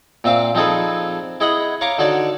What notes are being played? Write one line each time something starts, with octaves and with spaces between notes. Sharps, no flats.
A#2 C4 E5 F5 D6
F3 C4 D#4 G#4 A4 B4
E4 G#4 D#5 F#5 B5
C#5 F5 A#5 C#6 D6
D3 D#4 F#4 C#5 D5